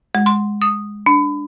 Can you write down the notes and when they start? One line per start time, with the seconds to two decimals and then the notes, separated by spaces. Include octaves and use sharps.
0.15 G#3
0.26 C6
0.62 D#6
1.06 D4